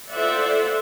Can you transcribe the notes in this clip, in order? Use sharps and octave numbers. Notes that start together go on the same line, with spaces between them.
F4 A4 C5 D5 E5 F#5